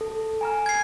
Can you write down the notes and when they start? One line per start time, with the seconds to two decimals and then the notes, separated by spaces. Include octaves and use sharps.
0.01 A4
0.41 G#5 A#5 F6
0.66 G#6 C7